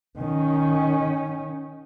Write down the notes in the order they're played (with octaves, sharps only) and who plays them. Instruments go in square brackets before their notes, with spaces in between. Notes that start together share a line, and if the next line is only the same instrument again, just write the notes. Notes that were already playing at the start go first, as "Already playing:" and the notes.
[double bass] D#3 C#4